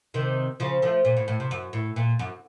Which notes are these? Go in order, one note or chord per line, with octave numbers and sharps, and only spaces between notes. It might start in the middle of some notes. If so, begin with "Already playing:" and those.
C3 D#3
C#3 F3
F3 A3
A#2
A2
A2
C3
F#2
A2
A#2
F#2